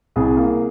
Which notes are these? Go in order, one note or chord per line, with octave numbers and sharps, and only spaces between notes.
C2 G#4
A#3